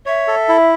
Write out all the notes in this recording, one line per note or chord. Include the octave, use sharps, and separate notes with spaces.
C#5 E5
A4
E4